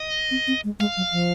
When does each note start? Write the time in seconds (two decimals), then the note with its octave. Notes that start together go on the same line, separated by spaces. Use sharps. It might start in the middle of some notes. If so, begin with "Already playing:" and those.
Already playing: D#5
0.31 C4
0.47 C4
0.64 G#3
0.79 G#3 F5
0.97 F#3
1.12 F3